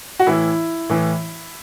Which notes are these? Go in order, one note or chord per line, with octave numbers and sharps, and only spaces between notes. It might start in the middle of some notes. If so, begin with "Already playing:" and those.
F#4
A2 E3 E4
A2 E3